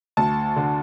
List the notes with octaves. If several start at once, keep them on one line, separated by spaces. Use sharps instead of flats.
D2 A5
D3